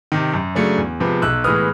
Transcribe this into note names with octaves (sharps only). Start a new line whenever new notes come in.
C3 D#3
F#2
C#3 F#3 A3 D4
E2
C3 F3 G#3 B3
B1 E6 F#6
A2 E3 G#3 B3 D#6 F6